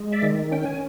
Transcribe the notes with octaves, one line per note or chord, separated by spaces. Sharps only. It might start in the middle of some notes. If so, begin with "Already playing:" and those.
Already playing: G#3
D5 E5
D#3
C#4 G5
G#5